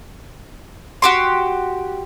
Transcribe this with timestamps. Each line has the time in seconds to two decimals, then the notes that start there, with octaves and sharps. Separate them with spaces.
1.02 F#4 G4 C6